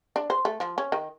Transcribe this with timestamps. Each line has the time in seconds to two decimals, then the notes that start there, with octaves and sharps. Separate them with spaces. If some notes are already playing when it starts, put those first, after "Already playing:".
0.16 D4
0.30 C5
0.45 A3
0.60 F3
0.78 C#4
0.92 D#3